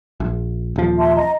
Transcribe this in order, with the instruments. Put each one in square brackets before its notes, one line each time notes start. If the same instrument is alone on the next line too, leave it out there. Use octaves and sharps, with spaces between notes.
[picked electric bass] A#1
D#1 F3
[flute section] E5 A5 C6
D#5 A#5